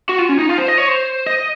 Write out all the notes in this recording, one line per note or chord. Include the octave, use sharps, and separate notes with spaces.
F#4
F4
C#4
D#4
F4
C5
D#5
C#5
C5
D#5